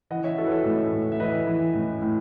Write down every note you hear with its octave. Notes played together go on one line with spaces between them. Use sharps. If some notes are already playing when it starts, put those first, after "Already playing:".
E3 D#5 F#5
C#5 E5
E3 F#4 A4
B4
A4 C#5
A2
A2
E5
E3 B4 D#5
E3
A2
A2